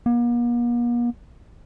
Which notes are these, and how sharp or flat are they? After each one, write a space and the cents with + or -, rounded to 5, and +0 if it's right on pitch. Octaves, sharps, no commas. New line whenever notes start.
A#3 +45